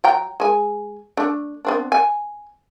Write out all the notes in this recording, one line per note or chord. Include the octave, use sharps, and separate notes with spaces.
F#3 G5 A#5
G#3 G#5
A3 D4
B3 C4 D4
G#5